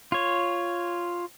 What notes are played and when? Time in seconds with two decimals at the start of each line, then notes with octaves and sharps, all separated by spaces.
0.12 F4 C#5